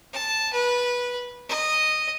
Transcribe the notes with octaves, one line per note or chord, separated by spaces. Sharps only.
A5
B4
D#5